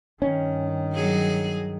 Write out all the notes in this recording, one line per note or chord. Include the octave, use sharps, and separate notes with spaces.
G2 D#3 C#4
F#3 G#4